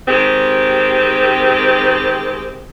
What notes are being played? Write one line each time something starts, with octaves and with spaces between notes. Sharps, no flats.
D#3 G#3 C4 G4